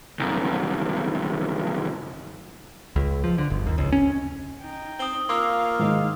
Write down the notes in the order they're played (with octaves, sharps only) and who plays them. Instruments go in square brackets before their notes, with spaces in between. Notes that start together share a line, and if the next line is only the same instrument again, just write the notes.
[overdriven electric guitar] C2 F#2
[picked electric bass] C#2
F3
D3
G1
D#2
C#2
C#4
[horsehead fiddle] D#4 G5
[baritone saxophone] C4 [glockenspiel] D#6 G7
[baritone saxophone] A#3 [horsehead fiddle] F4 F5 [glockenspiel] C6 D6 E6
[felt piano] G#2 D#3 D#4